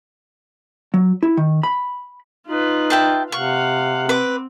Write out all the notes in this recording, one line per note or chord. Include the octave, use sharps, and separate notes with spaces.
F#3
E4
D#3
B5
D#4 F4 B4
E5 G5 A5
C3 F5 F#5 C#6
C4 B4 D6